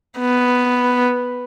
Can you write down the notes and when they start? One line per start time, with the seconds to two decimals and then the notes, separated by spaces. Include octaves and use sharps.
0.19 B3